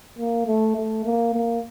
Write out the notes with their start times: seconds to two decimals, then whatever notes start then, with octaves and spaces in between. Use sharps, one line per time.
0.19 A#3
0.47 A3
0.76 A3
1.05 A#3
1.34 A#3